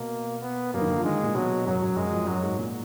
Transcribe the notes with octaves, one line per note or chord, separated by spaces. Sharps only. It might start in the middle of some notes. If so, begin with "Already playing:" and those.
Already playing: B2 A#3
B3
F#2 A#3
D#3
D3
F3
D#3 G#3
A#2
B2 F#3
F#2 F#3
F#2
F#2 G#3
F2
F#2 F#3
G#2
A#2